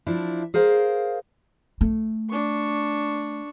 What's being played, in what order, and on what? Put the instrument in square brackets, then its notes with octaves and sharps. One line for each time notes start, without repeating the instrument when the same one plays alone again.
[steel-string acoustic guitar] F3 D4 E4
G#4 A#4 C5 F5
[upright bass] A3
[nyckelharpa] D4 C#6